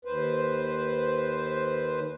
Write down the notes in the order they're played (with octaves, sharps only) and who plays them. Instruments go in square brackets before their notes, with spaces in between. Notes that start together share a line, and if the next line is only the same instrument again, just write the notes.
[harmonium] D#2 B4 C5